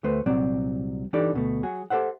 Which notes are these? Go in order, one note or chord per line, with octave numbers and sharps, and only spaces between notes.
D2 A3 B4 C5
C2 A#2 F#3 C4 D5
E3 D4 D#4 G4 A4 D5
D2 B2 A3
F#3 F#4 G#4
G4 A4 C5 E5 F#5